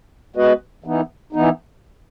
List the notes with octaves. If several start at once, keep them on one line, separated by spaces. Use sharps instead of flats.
G#3 B3 F#4 B4 D#5
E3 B3 D#4
E3 B3 D#4